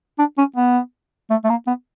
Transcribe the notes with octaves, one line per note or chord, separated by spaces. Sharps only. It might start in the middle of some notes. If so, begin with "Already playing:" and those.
D4
C#4
B3
A3
A3
A#3
B3